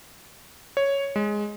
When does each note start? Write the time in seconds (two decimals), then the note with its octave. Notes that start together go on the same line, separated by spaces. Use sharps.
0.77 C#5
1.16 G#3